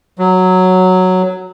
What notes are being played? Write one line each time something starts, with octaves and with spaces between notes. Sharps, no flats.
F#3